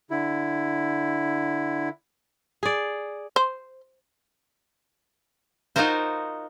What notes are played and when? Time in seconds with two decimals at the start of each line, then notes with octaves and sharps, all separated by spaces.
0.10 D3 E4
2.63 G#4 D5
3.36 C5
5.76 D#4 F4 F#4 A#4 C5